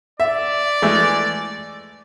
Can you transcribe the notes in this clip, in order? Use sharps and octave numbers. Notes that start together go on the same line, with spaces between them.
D5 E5
E3 G#3 A3